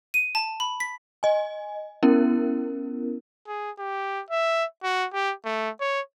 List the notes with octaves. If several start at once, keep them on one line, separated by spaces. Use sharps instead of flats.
D#7
A5
B5
B6
D#5 G#5
B3 C#4 E4 A#4
G#4
G4
E5
F#4
G4
A3
C#5